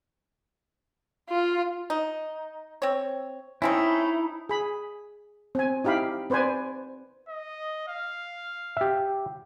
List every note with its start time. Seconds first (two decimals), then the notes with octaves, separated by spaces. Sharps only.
1.29 F4
1.90 D#4
2.82 C4 C#5
3.62 A3 C4 C#4 D#4 E4
4.49 G#4 B5
5.55 C4 G#5
5.84 D#4 E4 G4 F5 B5
6.30 C4 B4 C5 D5 G#5
7.28 D#5
7.88 F5
8.77 G4 E5